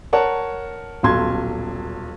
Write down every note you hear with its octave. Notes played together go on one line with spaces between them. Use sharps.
A#4 C#5 F#5 A5
D#1 B1 C6 G#6